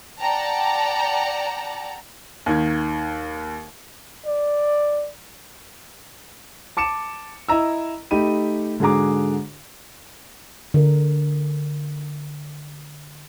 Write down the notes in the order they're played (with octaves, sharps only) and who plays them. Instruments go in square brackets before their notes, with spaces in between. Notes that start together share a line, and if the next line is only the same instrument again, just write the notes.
[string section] D5 F#5 G5 A5 A#5
[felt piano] D#2 D#3 G#6
[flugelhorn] D5
[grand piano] A5 D6 C#7 E7
E4 D#5 A#5 E6
A3 D#4 G4 B5 D#7
G#2 D3 F#4 G#4 A#5 D6
[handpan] D3 A#4